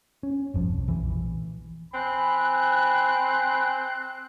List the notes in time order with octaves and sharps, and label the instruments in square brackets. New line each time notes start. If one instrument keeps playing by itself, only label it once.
[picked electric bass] C#4
G1 F2 F3
B1
A#1 E3
[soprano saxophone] C4 [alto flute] G#5 [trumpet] B5 [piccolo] F#6